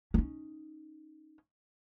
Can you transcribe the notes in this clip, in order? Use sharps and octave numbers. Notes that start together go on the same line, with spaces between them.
C#4 D#4